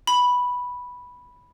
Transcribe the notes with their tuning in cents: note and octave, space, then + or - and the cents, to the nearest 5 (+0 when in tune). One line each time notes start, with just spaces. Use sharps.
B5 -5